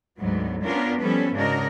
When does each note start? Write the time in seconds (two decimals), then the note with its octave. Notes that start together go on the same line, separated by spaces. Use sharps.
0.20 D2 G#2 F#3 B3
0.63 B3 C#4 D4 F4 A#4
1.01 F3 G3 B3 C#4 A4 B4
1.35 G#2 C#3 D4 F#4 A#4 D#5